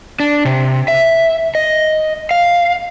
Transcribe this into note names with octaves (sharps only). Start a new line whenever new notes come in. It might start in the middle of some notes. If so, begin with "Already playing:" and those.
D4
C3
E5
D#5
F5